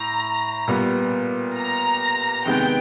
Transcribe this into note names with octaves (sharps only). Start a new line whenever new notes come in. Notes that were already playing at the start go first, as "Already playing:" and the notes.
Already playing: A2 A#5
A#2 G3 B3
A#5
C3 D#3 G#3 B3 G5